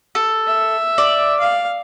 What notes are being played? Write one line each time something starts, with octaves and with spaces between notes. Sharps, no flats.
A4
E5
D5
F5